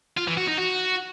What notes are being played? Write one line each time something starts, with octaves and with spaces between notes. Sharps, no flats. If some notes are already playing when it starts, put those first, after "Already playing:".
F4
E3
F#4
D#4
F#4